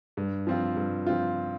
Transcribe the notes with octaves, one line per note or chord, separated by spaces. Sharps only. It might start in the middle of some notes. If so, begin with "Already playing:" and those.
G2
F3 C4 F4
G2
F3 C4 F4